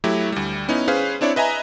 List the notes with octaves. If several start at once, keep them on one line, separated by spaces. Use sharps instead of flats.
F#3 A3 E4 G4
D2 G3
B3 C#4 D#4 E4
C#4 G#4 B4 C5 F5
C4 D4 E4 C#5 D5
B4 D#5 E5 G#5 A#5